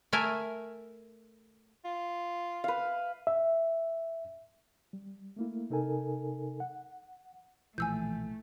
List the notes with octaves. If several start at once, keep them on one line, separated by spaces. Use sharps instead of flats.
A3 A#4 E5 G#5
F4
B4 F5
E5
G3
A3 A#3 E4
C3 D#4 A4 A#4 G#5
F#5
B1 A#2 E3 F3 A3 G#5 E6 G6